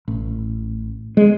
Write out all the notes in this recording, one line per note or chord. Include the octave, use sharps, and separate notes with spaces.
A1
G#3